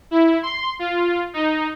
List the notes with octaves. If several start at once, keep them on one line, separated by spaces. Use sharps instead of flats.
E4
C6
F4
D#4